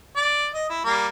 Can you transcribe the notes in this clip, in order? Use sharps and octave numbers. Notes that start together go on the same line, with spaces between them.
D5
D#5
E4
G3 A#3